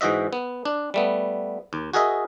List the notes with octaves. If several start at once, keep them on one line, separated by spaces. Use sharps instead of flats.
G#2 E3 F#4 D#5 E5
B3
D4
G3 A3 B3
D#2
F#4 G#4 A#4 D#5 E5